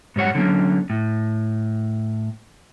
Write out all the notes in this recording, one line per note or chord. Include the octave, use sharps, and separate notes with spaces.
G#2 G3 C#5 F#5
D3 F#3 A#3 C#4
A2